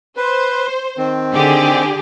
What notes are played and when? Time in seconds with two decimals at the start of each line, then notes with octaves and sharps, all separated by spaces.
0.17 B4 C5
0.97 D#3 C4
1.32 D3 G4 G#4